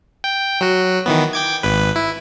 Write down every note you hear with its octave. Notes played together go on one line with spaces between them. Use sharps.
G5
F#3 F#4
D#3 E3 B3
G5 D6 G#6
G#1 B4
E4